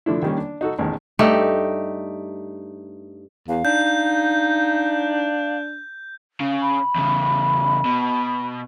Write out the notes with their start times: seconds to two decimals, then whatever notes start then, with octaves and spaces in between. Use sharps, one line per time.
0.06 D3 F3 A3 D4 E4
0.23 D#3 G3 A#3 C#4
0.37 D4
0.61 D#4 F#4 A4
0.79 A1 E2 D#3 A5
1.19 G2 A3 D#4 G4
3.48 E2 F5
3.65 D4 D#4 G6
6.40 C#3
6.62 B5
6.95 E2 C#3
7.85 B2